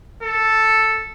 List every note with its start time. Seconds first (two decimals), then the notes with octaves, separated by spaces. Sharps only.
0.23 A4